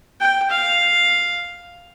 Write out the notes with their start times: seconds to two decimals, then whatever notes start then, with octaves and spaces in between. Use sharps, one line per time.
0.20 G5
0.51 F5